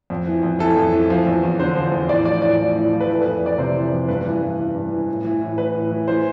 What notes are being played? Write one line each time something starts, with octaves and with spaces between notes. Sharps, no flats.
F2
E3
F2
E3 A4
F2
E3
F3
E2
E2
D3 C5
F3
E2
A2 D5
F3 D5
A2 D5
F3
A2
F3
B4
E3 A4
B4
F2
F2 D5
C3 C5
E3
F2
G2 B4
E3
G2
E3
G2
E3
A2
E3
A2
E3 B4
A2
E3
E3 C5